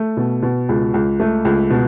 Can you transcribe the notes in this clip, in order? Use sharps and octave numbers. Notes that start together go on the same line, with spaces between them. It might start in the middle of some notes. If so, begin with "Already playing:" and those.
Already playing: A3
B2
B2
C#2
C#2
A3
C#2
B2